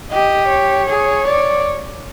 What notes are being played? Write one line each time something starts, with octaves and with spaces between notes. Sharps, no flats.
G4 D#5
C#5
G#4
D5